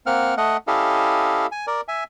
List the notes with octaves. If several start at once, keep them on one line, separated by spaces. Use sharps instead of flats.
A#3 C4 F#5 F6
A3 D#5 F#5
C#4 E4 G4 A4 D#5 F5
G#5
A#4 D5
E5 G#5